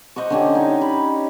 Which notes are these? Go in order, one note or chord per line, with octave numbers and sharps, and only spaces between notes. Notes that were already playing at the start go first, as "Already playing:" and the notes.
C5 D#5 F#5 C#6
D3 C#4 G4
D#4 C#5
B5